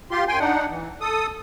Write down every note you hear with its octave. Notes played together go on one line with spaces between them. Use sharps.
F4 G4 C6
F#2 G5 G#5 C6
D4 D#4 F#5
E3
A4 D#6